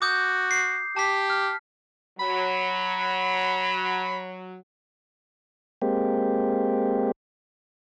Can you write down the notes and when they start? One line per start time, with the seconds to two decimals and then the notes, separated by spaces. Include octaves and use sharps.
0.02 F#4 D6 D#6 G6
0.51 C7
0.96 G4 A5 B6
1.30 F6
2.19 F#3 B5
5.82 G#3 A#3 C4 G4